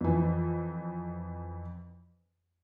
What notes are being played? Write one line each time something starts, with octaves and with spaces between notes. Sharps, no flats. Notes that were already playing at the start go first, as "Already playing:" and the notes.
F2 E3